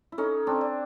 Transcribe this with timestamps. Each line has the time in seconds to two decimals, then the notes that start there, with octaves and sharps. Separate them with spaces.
0.12 E4
0.18 C#4 D#4 A4
0.47 C4 D4
0.61 D5